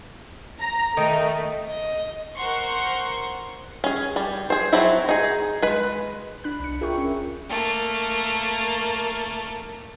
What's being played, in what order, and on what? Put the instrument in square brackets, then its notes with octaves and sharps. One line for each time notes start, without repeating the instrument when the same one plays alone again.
[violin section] A#5
[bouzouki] D#3 D#4 [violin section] A3
[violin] D#5
[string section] A#4 C5 F#5 C6 C#6
[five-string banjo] C#4 G#4
G3
G#4 C5
F3 F#3 C4 E4 F#4
D#4 G#4
G#3 B4
[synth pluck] D4 B5 F#6
C2 C#7
F4 G#4 A#4 E5 G5 C#6
C#4
[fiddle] A3 A#3